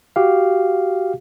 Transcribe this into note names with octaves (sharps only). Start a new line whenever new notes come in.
F#4 G4 F5